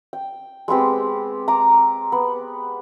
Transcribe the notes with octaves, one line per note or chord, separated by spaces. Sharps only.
G5
G#3 B3 C4 G4
A#5 D6
B3